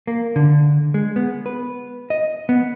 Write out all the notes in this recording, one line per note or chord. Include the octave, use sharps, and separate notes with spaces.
A#3
D3
G#3
B3
B4
D#5
B3